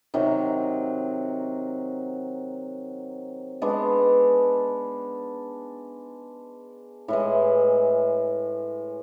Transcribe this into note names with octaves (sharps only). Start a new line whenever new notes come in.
C3 D#3 F#3
G#3 B3 D4
A2 E3 G#3